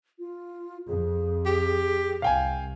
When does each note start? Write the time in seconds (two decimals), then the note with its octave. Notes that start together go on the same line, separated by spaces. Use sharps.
0.19 F4
0.88 F2 G#4
1.46 G4
2.22 C2 F5 G5 G#5